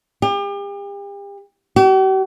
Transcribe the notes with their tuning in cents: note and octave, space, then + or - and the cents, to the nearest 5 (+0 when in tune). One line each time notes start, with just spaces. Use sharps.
G4 +40
G4 -45